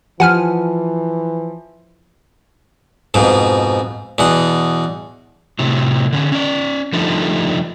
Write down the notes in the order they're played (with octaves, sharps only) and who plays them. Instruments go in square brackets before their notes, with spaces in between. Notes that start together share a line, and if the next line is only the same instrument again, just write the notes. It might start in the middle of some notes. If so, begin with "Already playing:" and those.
[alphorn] E3 [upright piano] F3 [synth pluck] F#5 G#5 F6
[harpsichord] F2 G#2 B2
E2 B2 F#5
[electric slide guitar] A2 C3 F#3
D3 C#4
C#4 D5
D3 F3 G3 A3 D#4